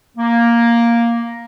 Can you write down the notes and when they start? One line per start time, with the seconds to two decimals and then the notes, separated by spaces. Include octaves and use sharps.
0.18 A#3